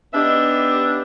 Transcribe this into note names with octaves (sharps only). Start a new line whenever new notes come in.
B3 D4 D#4 G4 D#5 E5